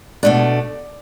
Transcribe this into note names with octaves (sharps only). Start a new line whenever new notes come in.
B2 A3 D4 D5